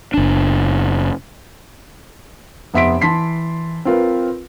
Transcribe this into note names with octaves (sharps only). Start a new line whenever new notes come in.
F#1 D4
F1 B3 E5 C6 B6 D7
E3 A5 C6 B6 C7
C4 F4 A#4 B4